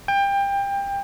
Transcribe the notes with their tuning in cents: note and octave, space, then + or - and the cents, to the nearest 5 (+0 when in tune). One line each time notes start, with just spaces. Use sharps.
G5 +25